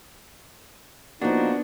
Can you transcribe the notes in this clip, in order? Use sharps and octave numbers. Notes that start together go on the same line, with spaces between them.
F3 A#3 B3 D4 D#4 F#4